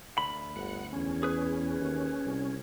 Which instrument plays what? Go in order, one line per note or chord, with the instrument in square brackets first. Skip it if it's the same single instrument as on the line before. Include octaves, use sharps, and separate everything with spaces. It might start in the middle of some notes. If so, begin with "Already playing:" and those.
[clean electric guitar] D2 B5
[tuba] G1 [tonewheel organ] F#5
[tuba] E2 [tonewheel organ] C#4
[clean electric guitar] G#4 B4
[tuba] D#2
C2